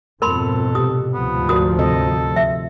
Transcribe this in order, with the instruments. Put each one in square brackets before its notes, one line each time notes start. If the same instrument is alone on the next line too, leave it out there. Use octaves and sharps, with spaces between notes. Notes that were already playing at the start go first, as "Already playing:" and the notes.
[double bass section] F2 G#2 B2 [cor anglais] A4 [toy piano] A#4 B5 C6
[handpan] C3 G4 [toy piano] D#6
[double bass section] D2 G#2 F3 [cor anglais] B3
[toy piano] F#4 D#6 [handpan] A#4 D5
[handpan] C3 C4 D#5 [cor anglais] A4
[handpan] F3 [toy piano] E5